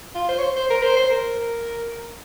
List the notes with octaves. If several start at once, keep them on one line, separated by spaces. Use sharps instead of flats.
F4
C5
C#5
C5
C5
A#4
C5
C5
A#4